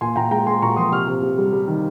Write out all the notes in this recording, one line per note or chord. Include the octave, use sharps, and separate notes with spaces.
A#2 G#5 C6
A#2 G5 A#5
G#3 G5 A#5
G#3 G#5 C6
A#2 A#5 C#6
F3 C6 D#6
C3 C#6 F6
C3
C3
G3
G3
D#3